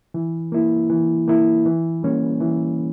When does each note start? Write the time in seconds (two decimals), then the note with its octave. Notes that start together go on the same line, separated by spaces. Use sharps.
0.14 E3
0.52 A#3 E4
0.90 E3
1.28 A#3 E4
1.66 E3
2.03 G3 A#3 C#4
2.40 E3